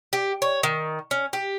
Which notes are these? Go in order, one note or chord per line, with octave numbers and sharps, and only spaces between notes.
G4
C#5
D#3
C#4
G4